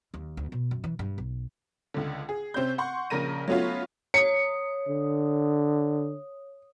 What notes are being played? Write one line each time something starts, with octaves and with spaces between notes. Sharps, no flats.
D#2
D2
B2
F#2
E3
G2
B1
C#2 D3
G#4
C3 C4 C#4 G6
F#5 C6 C#6
A#1 C#3 A#4 A#6 D#7
F#3 A3 B3 C#4 F4
C#5 D#6 C#7
D3